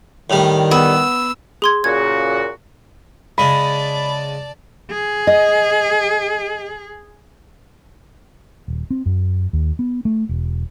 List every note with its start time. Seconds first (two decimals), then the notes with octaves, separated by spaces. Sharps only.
0.30 A2 D#3 G3
0.71 B3 E6
1.62 G#4 C6 G#6
1.84 A#2 C#3 F#4 G#6
3.38 C#3 G#3 D5 A5 B5
4.91 G#4
5.27 D#5
8.68 D#1
8.90 C4
9.06 F#2
9.53 D#2
9.79 B3
10.05 A3
10.29 E1